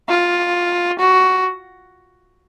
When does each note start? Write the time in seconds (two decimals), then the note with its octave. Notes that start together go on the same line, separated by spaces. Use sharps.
0.09 F4
0.99 F#4